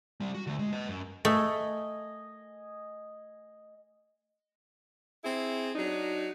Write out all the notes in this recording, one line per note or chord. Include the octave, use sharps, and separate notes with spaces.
G3 C4
F#4
D3 A3
G#3
B4 D#5
F#2
A3 D#5 G#5
C4 E4 G#4
F#3 D4 D#4